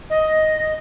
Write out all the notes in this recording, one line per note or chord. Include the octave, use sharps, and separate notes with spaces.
D#5